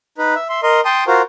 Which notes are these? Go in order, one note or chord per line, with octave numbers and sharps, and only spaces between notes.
D#4 B4
E5
E5 C6
A#4 D#5 C6
G5 A5 C6 D#6
F4 F#4 A#4 C5